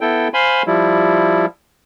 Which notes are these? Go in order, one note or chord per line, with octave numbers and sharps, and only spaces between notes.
B3 E4 A4 G5
C5 F5 G#5 B5 C6
F3 G3 E4